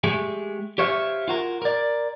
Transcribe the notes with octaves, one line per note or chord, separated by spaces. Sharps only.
G#3 A3 G4
G4 C5 C#5 E5 F5
F4 F#4 A#4
A#4 D5